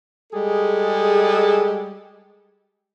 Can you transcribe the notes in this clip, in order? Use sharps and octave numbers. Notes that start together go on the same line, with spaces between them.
G3 G#3 G#4 A4